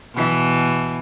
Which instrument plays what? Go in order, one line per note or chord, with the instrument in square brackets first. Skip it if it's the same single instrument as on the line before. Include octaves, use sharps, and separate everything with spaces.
[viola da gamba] B2 E3